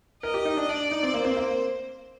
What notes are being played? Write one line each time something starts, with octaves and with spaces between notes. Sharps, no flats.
A#4 D#5
G4
D#4
D4
D4 D5
D#4
C4
A#3 C5
C4
A#3